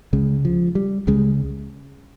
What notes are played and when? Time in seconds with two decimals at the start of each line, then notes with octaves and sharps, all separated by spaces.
0.13 C#2 C#3 G#3
0.45 F3
0.75 G3
1.07 C#2 C#3 G#3